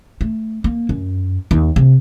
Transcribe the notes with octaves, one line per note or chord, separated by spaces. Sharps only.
A3
A#3
F#2
D#2
C3